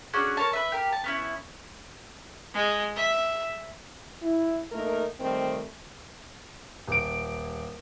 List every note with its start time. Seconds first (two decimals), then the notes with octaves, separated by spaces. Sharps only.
0.13 C#4 D4 F#4 G#4
0.37 A#4 C#5 A5
0.53 B4 E5
0.72 G4 A#4
0.93 A5
1.04 B3 C#4 E4
2.54 G#3
2.97 E5
4.22 E4
4.72 A3 A#3 D#4 A#4
5.20 D#3 G3 A3 C4
6.88 D#1 D7